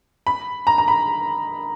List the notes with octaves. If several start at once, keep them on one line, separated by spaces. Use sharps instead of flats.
B5
A#5
A#5
B5